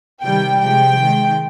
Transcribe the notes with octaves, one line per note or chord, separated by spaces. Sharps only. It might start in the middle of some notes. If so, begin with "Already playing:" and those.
C3 D#3 G3 G5
C3 F3 G#3 G5
D#3 G#3